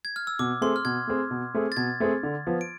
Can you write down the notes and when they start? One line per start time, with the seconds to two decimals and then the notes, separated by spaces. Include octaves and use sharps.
0.05 G#6
0.16 F6
0.27 E6
0.39 B2 D6
0.61 A3 C4 G#4 C6
0.76 F6
0.85 B2 G#6
1.07 A3 C4 G#4
1.31 B2
1.54 A3 C4 G#4
1.72 A6
1.77 B2 G#6
2.00 A3 C4 G#4
2.23 D3
2.47 F3 B3
2.61 D7